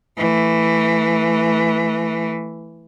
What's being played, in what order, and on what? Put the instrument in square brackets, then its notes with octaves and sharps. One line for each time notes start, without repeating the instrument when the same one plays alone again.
[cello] E3 A3